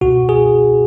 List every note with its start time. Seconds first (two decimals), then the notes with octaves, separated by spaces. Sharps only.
0.01 C#2 B2 F#4
0.29 G#4